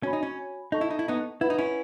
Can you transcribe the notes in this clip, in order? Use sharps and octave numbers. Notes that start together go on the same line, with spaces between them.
C#4 F#4 C#5 G#5 B5
D#4
C#4
D#4 A4 D#5 A5 C#6
E4
D#4
E4
B3 D#4
E4 B4 F#5 B5
D#4
C#4 E4